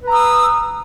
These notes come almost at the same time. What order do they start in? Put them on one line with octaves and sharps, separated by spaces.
B4 A#5 E6 D#6